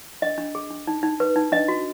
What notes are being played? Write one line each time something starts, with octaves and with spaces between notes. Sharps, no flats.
D4 D#5
D4
G#4
D4
D#4
D#4
B4
D#4
D4 D#5
F#4